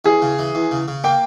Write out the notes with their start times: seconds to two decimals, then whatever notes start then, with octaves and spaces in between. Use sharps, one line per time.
0.05 E2 G#4
0.22 C#3
0.39 E3
0.55 E2
0.71 C#3
0.88 C#3
1.04 A#3 G5